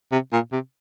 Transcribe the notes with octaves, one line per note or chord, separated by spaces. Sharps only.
C3
A#2
C3